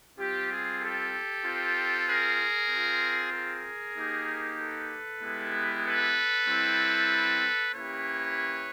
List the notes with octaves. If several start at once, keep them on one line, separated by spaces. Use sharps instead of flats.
G3 C4 F4 G4
G#4
G4 A4
C4 F4
G#4 A#4
C4 F4
G#4 A#4
A#3 D#4 G4
A4 B4
G#3 B3 E4 G4
A4 B4
G3 C4 E4
A#3 C#4 E4 G4 B4 C#5